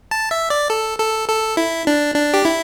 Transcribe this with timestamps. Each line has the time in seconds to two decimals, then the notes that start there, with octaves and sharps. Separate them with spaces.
0.11 A5
0.31 E5
0.50 D5
0.70 A4
0.99 A4
1.29 A4
1.57 E4
1.87 D4
2.15 D4
2.34 G4
2.45 E4